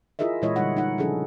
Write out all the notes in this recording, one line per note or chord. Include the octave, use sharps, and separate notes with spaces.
E4 F4 G#4 A#4 D#5 E5
A#2 E3 G#3 E4 C#5 D#5
D3 G3 D#4 C#5 F#5
D#4 F#5
C#3 F3 C#4 D4 G#4 A4